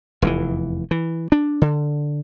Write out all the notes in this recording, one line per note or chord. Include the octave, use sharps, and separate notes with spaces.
F1 E2 C3 E3
E3
D4
D3